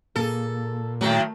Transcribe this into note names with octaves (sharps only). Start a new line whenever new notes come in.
A#2 A#3 G#4 A4
A2 D#3 F#3 A3 A4 A#4